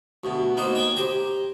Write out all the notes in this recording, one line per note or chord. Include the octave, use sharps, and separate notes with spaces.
D2 B2
A#3 B3 D#4 C5
C#5 G5 G#5
G4 C5 A#5